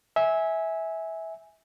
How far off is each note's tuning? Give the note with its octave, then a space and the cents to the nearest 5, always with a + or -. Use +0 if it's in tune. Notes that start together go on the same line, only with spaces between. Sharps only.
E5 -20 G#5 +0